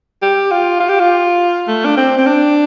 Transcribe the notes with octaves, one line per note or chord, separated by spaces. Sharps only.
G4
F4
F4
G4
F4
A3
D4
C4
C4
D4